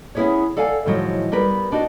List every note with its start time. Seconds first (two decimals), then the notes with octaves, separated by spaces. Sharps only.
0.15 B3 C#4 E4 G#4 B4 C#5
0.57 A4 D5 F5 F#5 G#5
0.86 A2 D#3 F3 F#3 G#3
1.32 G3 B3 A#4 B4
1.72 D4 D#4 F#4